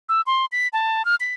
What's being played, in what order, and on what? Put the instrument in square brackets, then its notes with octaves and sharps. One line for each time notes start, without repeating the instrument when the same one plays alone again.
[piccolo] E6
C6
B6
A5
F6
B6